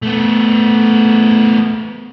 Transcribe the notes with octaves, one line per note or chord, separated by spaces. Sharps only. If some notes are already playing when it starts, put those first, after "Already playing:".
A3 B3